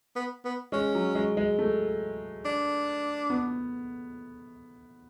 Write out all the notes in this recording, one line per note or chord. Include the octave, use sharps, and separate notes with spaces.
B3
B3
G#3 C#4
F#3
G#3
G#3
A3
D4
B3